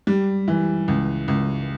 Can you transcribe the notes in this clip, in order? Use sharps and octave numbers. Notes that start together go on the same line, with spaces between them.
G3
E3
C#2
C#2